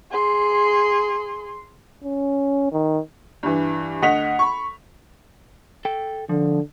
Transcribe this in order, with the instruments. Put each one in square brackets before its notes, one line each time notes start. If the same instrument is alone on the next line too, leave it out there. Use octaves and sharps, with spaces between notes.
[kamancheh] G#4 C6
[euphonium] C#4
D#3
[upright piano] G2 E3
D2 D#5 F#5 B6 F7
B5 C#6
[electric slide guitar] A4 G5
[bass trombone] D3 [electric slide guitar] F3